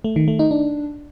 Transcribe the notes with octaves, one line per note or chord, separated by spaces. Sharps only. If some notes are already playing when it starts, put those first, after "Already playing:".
A3
D#3
A3
D#4
D4